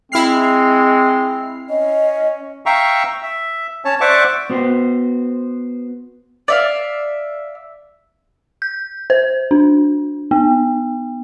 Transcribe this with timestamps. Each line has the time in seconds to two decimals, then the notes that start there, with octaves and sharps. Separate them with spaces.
0.12 G#3 C4 E4 F6 C7
1.70 C#4 D#5
2.66 E5 F5 G5 A#5 C#6
3.22 E5
3.85 C#4 C#5 A5
4.01 C5 D5 E5 F#5 C#6 D6
4.50 B3 F#4 C5
6.48 D5 E5 F5
8.62 G6
9.10 C5
9.51 D4
10.31 B3